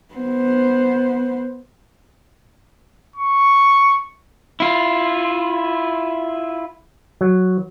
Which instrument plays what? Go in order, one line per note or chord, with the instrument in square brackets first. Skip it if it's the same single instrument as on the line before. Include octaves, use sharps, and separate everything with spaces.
[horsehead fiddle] B3 C5
[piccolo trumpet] C#6
[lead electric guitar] E4 F4
[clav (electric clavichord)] F#3